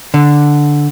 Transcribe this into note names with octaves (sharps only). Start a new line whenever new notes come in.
D3